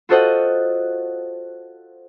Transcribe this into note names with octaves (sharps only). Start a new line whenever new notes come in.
F4 F#4 A4 C5 D#5 F#5